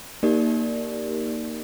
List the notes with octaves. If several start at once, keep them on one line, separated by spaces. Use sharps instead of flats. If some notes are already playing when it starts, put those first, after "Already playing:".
A#3 D#4 G4 A#4 D5